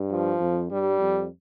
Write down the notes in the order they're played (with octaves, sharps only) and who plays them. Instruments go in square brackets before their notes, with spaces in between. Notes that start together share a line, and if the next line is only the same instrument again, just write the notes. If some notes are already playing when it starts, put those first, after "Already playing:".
Already playing: [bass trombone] G2
[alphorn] F3
[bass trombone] F2
[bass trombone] G2 [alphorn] G3
[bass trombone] F2